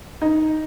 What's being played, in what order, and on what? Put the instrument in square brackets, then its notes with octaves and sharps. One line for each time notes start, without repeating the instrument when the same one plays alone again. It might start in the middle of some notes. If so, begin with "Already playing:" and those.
[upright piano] D#4